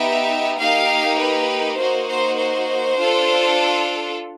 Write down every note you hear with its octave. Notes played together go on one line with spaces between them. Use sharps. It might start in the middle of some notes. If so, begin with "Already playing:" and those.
Already playing: B3 D#4 G4 E5
A#3 D#4 G4 F5
B4
A#3 D#4 F#4 C5
C5
C5
D4 F4 A4